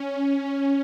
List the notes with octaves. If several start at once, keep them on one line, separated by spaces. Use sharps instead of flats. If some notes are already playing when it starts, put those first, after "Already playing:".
Already playing: C#4